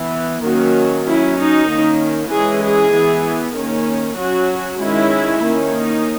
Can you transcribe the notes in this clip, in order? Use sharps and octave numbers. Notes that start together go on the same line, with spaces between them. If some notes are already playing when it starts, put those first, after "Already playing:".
Already playing: E3 B3
D#3 F#3 A#3 C#4 F#4
F#3 C#4 E4
D#4
D#3 A#3 C#4
E3 G#3 C#4 G#4
G#4
E3 B3
D#3 A#3 C#4
F#3 C#4 F#4
D#3 G#3 C#4 E4
D#3 A#3 C#4
D#4